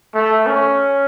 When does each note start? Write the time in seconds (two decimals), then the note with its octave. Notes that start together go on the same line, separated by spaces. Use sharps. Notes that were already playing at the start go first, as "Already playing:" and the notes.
0.14 A3
0.46 C#4